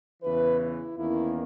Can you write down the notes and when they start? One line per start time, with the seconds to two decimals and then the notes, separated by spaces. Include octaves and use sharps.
0.22 E2 C#3 E3 B4
0.60 E4
0.97 E2 D#3 A#3 C#4 E4